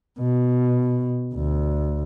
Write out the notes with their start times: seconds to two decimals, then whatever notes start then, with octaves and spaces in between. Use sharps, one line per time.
0.20 B2
1.35 D2